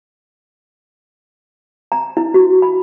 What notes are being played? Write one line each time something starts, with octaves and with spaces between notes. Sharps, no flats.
A#5
E4
F#4
B5